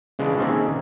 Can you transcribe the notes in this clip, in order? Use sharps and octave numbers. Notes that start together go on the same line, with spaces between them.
C#3 E3 G#3 D4
D#3 A#3 C4 C#4 G#4 A4